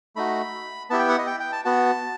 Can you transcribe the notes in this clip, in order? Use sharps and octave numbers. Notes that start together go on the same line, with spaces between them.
A3 D#4 F#4 B5
B3 E4 G4 A5
G5
F#5
D#5
G5
G5
A5
B3 F#4 A5